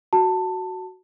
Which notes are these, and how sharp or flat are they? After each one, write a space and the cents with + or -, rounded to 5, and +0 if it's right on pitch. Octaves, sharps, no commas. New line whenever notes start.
F#4 +5 A5 +15